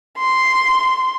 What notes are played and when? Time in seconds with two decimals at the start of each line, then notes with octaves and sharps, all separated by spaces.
0.18 C6